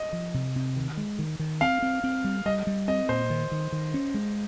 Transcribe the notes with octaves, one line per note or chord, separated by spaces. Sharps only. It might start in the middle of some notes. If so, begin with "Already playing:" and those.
Already playing: D#5
F3
C3
C3
D#3
G#3
D#3
D#3
C4 F5
C4
C4
G3
G3 D#5
G3
C4 D#5
A#2 C5
D#3
D#3
D#3
C#4
G#3